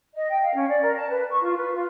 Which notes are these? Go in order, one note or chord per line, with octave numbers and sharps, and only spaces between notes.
D#5
G5
F5
C#4
D5
A#4
A5
B4
C#6
F4
B4
F4